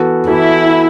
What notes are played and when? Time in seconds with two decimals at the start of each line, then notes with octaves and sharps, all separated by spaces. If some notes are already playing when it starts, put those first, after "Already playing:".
Already playing: E3 B3 F#4 A4
0.28 E3 B3 E4 F#4 A4